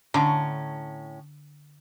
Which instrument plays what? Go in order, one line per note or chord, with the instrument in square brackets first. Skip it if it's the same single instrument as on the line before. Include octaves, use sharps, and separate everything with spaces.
[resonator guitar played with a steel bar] A2 C#4 A#5 [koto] D3